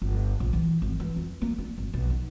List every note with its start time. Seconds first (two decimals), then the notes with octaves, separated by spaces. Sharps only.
0.02 G1
0.40 A#1
0.53 E3
0.82 G#1
1.00 E3
1.16 F2
1.42 A#3
1.58 D4
1.78 G#1
1.93 B1
2.10 D#4